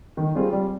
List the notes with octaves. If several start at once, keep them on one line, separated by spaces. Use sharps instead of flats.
D#3
G3 C4 F4 G#4
G3